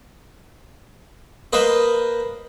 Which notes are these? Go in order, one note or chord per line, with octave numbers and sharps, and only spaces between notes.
A#3 B4 C5 D#5